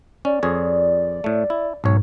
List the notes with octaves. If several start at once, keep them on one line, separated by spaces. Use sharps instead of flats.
C#4 D5
F2 G#4 C#5
A2 A3
E4
B1 G#2 C#5